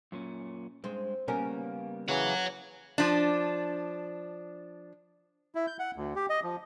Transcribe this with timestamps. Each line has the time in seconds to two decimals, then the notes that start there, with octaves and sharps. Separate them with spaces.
0.12 F#2 A#2 C#4
0.84 G2 G#3 C4
1.28 C#3 G3 A#3 B3 C#4 A#4
2.08 C#3 E3 C#5 F#5
2.98 F3 D4
5.55 E4
5.67 G6
5.79 F#5
5.96 D2
6.15 G4
6.30 D#5
6.43 F3